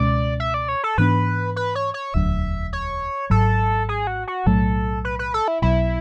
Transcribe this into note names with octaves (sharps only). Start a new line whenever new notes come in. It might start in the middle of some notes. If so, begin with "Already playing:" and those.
Already playing: C#2 B2 G#3 C#4 D5
E5
D5
C#5
A4
G#2 E3 B3 D4 B4
B4
C#5
C#5
E1 D2 D3 F#3 E5
C#5
G#1 G#2 F#3 A4
G#4
F#4
F#4
B1 A2 F#3 A3 A4
B4
B4
A4
E4
B1 B2 F#3 E4